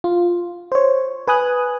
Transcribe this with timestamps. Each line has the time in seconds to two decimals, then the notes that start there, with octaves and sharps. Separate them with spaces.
0.04 F4
0.72 C5 C#5
1.28 B4 G#5 D#6 F#6